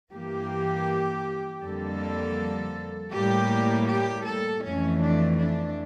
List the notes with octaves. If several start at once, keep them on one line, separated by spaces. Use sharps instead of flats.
G2 E3 A#3 G4
F2 D3 G3 A#3 A4
A2 G3 A#3 G4
G4
A4
F2 E3 A3 C#4
D4
D4